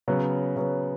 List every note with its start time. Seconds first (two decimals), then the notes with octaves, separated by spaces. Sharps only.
0.08 C#3 F#3 B3
0.56 C#3 F#3 B3